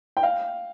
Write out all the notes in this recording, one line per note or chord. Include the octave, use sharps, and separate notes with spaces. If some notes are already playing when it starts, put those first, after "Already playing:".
G5
F5